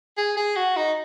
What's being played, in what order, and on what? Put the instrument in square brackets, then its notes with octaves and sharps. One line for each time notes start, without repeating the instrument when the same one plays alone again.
[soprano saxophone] G#4
G#4
F#4
D#4